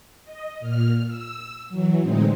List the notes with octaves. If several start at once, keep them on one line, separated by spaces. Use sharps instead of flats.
D#5
A#2 F6
E6
E3 F#3
A2 D3 E3 G#3 C4 D#4